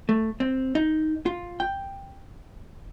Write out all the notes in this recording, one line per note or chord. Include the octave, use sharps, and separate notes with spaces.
A3
C4
D#4
F4
G5